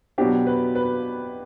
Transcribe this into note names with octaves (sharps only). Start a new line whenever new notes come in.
B2 F#3 B3 D4 G4
B4
B4